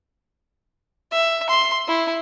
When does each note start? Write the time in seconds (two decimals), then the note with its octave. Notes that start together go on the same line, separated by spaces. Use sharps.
1.12 E5
1.49 C6
1.87 E4